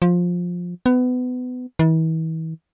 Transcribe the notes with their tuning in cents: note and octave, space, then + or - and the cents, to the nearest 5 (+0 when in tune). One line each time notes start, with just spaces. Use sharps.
F3 +15
B3 +25
E3 -40